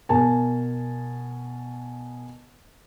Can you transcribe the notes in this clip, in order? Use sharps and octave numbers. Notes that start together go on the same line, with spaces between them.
B2 A#4 G#5 A5